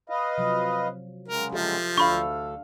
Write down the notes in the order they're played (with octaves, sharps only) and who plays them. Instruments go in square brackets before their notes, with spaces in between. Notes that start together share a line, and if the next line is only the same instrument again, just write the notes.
[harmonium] B4 D#5 F5
[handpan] C3 F3 F#3
[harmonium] C#3 F#3 G#3 [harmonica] A#4
[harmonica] F3 [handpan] G4 A4 E5
[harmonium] D2 A4 [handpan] D4 F5 [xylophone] B5 C#6